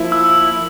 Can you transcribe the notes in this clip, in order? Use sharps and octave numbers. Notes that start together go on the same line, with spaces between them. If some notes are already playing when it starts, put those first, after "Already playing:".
Already playing: F3 A#3 E4
E6